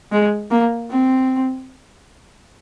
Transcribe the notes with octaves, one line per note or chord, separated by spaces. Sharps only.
G#3
A#3
C4